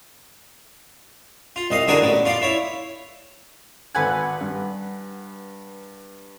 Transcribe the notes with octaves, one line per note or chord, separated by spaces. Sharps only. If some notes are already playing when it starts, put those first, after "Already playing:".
F4
C2 D#5 F5
D3 E3 D4 F#4 G#4 A#4
A1 B3
F4 D5 F5
E4 C#5
G#1 A4 B4 F#5 G#5 F#6
G2